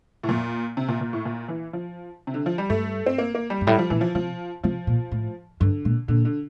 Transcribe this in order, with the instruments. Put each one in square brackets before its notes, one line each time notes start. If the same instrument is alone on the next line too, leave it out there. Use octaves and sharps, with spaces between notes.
[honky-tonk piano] A2
[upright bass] F2 [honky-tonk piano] A#2
[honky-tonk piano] C3
A#2
A#2
A2
A#2
E3
F3
C3
D3
F3
G3
[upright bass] G2 [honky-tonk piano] A3
[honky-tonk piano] C4
A#3
A#3
G3
[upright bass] G2
[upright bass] A2 [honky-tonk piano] G3
[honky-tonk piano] F3
[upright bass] A#2 [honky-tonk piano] E3
[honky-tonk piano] F3
[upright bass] C3 [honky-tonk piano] F3
[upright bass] C3 [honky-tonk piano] F3
[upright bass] A#2
A2
[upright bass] G2 [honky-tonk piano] D3
[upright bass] A#2
[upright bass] A#2 [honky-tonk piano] D3
[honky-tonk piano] D3